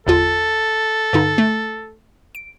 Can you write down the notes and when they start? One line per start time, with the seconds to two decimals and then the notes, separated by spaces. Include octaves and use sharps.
0.06 G1 E2 F4 A4
1.13 G2 D3 D#4
1.38 A3
2.35 D7